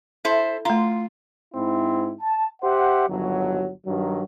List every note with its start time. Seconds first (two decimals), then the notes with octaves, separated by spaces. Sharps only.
0.25 E4 A4 C5
0.65 A3 F4 A#5
1.54 G#2 C4 E4
2.21 A5
2.62 G4 C5 E5 F#5
3.08 G1 D#2 F#3
3.86 G2 D#3 F#3